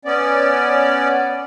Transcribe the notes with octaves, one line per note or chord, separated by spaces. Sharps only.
B3 C#4 D5